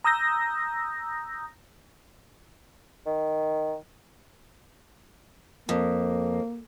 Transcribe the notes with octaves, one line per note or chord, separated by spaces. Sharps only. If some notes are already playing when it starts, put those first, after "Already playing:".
A#5 D#6 E6 G6 A#6
D#3
F2 A#3